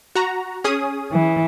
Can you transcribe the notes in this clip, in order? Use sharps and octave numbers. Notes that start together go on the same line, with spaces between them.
F#4 A#5
C#4 G#4 D#6
E3